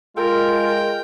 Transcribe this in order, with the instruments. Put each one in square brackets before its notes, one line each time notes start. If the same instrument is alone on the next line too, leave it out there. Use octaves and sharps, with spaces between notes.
[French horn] G#3 [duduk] F4 [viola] A#4 [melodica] G5